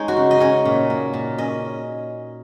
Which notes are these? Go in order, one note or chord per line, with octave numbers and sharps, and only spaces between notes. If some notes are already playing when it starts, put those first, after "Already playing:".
Already playing: G#3 D#4 C#5
F#4
C#3
D#5
C#4 C#5
A#2
A#3
A#2
C#4 D#5